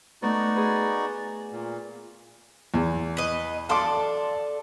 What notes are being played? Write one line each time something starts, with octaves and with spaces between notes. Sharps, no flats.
A3 B3 D#4 F#4 D5
G#4 B4
A#2
E2
B4 D#5
D4 A4 F5 C6 D6